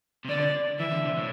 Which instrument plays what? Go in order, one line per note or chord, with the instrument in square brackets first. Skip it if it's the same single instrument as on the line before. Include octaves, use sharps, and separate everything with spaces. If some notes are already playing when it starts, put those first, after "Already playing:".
[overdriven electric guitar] C3
[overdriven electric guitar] D3 [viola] D5
[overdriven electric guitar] E3 [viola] E5
[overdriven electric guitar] D3
C3
A2